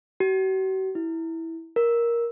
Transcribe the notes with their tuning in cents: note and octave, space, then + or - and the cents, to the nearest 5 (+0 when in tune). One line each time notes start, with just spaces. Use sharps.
F#4 +45
E4 -10
A#4 +10